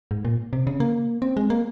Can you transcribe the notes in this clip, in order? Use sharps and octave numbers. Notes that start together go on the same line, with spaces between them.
G#2
A#2
C3
C#3
A#3
C4
G#3
A#3